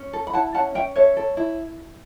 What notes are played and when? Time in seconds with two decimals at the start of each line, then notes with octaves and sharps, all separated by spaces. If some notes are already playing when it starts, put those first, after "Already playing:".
Already playing: C#4
0.13 A4
0.27 B5
0.33 E4 F#5 A5
0.54 C#4 F#5 A5
0.75 C#4 E5 G5
0.96 A4 C#5 E5
1.17 A4
1.37 E4